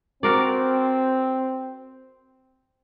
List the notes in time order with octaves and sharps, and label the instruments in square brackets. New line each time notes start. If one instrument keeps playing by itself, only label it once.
[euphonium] C4 [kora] F#4 A#4 D5